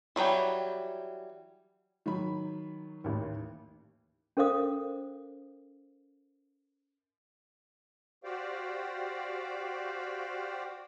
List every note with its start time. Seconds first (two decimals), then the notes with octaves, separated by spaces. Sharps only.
0.16 E3 F#3 G3 G5
2.06 D#3 F#3 B5
3.04 A1 D#2
4.37 C#4 A4 A#4 C5 F5 D#6
8.24 F#4 G4 C5 D5 F5 G5